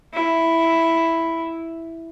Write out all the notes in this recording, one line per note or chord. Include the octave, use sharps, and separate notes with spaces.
E4